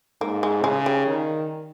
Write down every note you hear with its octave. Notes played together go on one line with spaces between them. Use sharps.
G#2 A#3
G#3
C#3 G#3
G3
D#3